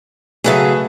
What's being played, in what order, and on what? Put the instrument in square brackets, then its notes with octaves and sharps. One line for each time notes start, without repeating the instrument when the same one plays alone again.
[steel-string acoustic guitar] C#3 F#3 G#4 [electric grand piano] A3 B4 E5